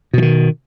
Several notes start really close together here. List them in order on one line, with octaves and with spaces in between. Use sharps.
B2 E3 D#3